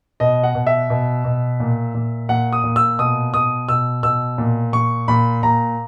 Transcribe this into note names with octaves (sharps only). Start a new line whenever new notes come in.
B2 D#5
F#5
B2
E5
B2
B2
A#2
A#2
A#2 F#5
D#6
A#2
E6
B2 D#6
B2 D#6
B2 E6
B2 E6
A#2
A#2 C#6
A#2 B5
A#2 A#5